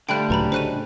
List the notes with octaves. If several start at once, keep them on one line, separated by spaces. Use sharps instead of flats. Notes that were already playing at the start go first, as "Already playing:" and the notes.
D3 G3 A3 C4 F4 G5 B5 F#6
C#2 A2 F#3 B4 A#5 B5
C#3 F#3 D4 D#4 C5 F#6 D#7